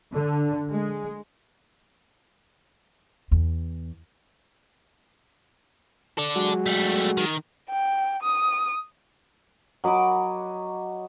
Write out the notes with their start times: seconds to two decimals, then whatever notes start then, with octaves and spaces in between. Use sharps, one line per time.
0.13 D3
0.70 G#3
3.32 E2
6.17 A4 D5
6.36 F#3 G#3 F#4
6.66 G3 A3
7.17 D#3
7.70 G5
8.23 D#6
9.84 F#3 D#5 B5 D6